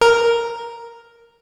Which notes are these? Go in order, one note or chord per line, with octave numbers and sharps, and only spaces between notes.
A#4